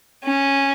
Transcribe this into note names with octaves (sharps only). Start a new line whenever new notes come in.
C#4